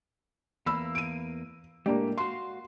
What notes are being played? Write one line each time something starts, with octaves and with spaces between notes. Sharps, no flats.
E2 A#3 B5 E6
D7 D#7
A2 G#3 A#3 D4 G4
F#4 F5 C6